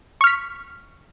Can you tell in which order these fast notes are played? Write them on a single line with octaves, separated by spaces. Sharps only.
C#6 F6 B6